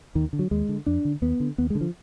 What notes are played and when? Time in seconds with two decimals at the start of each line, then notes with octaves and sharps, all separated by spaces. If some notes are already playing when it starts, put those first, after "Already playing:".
0.15 D#2 D#3
0.33 D3
0.39 F#3
0.51 D#2 G#3
0.69 D3
0.86 F2 D4
1.05 D3
1.22 D#2 B3
1.40 D3
1.58 D#2 B3
1.70 G#3
1.75 D3
1.81 F3